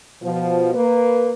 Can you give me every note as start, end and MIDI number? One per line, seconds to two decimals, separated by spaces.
0.23 0.73 47
0.23 0.73 53
0.75 1.32 58
0.75 1.32 71